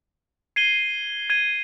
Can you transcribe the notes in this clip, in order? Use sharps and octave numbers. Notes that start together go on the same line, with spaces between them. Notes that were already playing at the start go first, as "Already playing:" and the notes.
G#6 C7 D#7 G7
G#6 D#7 G7